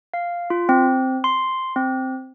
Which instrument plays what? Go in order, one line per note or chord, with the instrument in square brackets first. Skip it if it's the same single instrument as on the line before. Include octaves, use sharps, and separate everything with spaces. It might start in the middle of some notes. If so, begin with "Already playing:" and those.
[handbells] F5
F4
C4
C6
C4